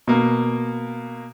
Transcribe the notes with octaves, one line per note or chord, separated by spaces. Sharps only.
B2 A#3